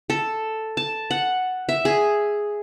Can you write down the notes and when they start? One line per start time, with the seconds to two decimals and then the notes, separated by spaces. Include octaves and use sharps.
0.10 A4
0.77 A5
1.11 F#5
1.69 E5
1.85 G#4